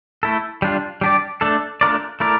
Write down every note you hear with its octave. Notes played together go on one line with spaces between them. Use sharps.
A3 E4 A4
G3 D4 F4
G3 D4 G4 D5
A3 D4 A4 D5
A3 D4 F4 A#4 D5
A3 E4 A#4 D5